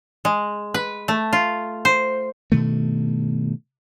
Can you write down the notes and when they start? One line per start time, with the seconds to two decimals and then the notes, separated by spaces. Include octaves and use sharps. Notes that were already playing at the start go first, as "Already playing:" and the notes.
0.25 G#3
0.74 B4
1.08 A3
1.33 F4
1.85 C5
2.52 G2 B2 D#3 A3